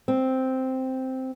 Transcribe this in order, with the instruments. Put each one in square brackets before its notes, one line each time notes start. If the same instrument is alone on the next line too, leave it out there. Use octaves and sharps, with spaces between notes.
[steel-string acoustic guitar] C4